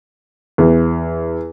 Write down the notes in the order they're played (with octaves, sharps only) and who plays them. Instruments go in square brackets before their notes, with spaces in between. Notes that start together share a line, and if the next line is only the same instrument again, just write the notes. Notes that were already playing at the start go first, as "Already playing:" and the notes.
[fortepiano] E2